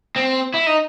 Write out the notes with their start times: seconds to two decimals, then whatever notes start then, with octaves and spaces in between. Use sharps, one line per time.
0.16 C4
0.54 E4
0.66 D#4